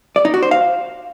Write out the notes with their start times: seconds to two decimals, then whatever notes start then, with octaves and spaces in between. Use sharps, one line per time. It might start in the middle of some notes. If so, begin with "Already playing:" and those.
0.16 D5
0.25 D#4
0.34 F#4
0.43 C5
0.51 F5